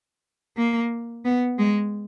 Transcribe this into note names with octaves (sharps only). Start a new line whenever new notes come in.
A#3
B3
G#3